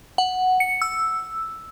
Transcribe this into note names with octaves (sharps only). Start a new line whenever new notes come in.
F#5
C#7
E6